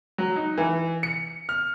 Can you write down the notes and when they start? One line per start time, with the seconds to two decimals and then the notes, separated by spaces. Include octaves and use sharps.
0.18 F#3
0.36 D#4
0.58 E3
1.03 C#7
1.49 F6